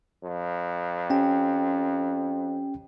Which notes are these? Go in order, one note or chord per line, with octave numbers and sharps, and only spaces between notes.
F2
C#4 G4 G5